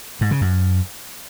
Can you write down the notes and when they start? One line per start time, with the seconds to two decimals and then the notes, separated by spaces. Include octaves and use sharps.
0.21 G#2
0.31 C#3
0.41 F#2